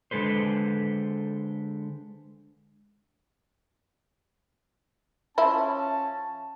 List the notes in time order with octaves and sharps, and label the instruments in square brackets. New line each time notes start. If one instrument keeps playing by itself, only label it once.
[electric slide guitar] D3 G#3 A4 B4 C5
[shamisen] F3 E4 [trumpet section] C#4 A5